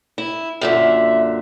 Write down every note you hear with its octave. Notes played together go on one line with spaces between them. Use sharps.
E4
F#2 A#2 D3 E5